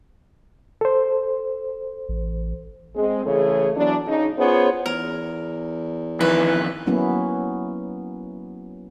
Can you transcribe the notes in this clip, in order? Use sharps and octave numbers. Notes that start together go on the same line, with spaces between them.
A4 C5
A1
G#3 C4
C#3 E3 A3 G#4 A4 C#5
E3 F#3 B3 D4
C#3 D#4
B3 C#4 F4 G#4 C5 C#5
E2 A#4
F2 D#3 E3 B4
F#3 A#3 B3 C#4 E4